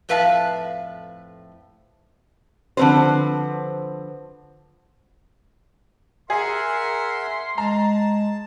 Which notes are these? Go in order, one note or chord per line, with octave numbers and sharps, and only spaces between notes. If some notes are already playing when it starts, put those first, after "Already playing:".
F2 A2 B4 E5 F5 A5
D3 F3 C4 B4 C5
G#4 A#4 E5 F#5 C6
G#3 A5 A#5